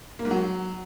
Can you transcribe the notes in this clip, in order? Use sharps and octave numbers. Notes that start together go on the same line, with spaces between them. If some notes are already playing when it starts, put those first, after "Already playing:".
A#3
G#2
F#3